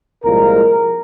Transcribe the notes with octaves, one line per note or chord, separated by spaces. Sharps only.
C2 A#2 F3 G#3 A#4